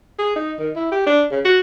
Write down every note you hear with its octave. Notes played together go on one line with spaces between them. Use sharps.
G#4
D#4
D#3
E4
G4
D4
C#3
F#4